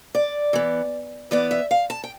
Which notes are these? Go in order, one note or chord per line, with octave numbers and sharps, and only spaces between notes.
D5
E3 B3
E3 B3 D5
E5
F5
A5
G5